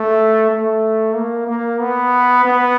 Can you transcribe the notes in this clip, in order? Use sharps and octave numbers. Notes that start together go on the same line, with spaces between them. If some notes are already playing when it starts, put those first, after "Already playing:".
Already playing: A3
A3
A#3
A#3
B3
B3